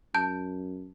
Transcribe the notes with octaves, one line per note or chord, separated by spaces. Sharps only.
F#2 A5 G6